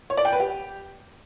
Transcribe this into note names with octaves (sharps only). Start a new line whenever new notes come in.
C#5
D5
G5
B4
G4